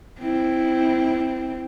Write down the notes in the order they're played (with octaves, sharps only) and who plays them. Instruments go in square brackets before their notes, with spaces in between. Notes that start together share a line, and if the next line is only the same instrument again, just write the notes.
[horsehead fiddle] C4 E4